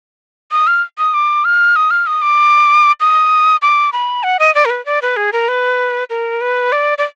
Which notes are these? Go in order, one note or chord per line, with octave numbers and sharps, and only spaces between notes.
D#6
F6
D#6
D6
F6
D#6
F6
D#6
D6
D#6
D6
B5
F#5
D#5
D5
A#4
B4
D5
B4
G#4
A#4
B4
A#4
B4
D5
D5